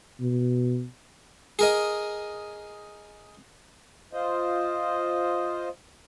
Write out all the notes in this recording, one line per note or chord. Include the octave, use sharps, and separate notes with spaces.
B2
G#4 A#4 D#5
F4 C5 D#5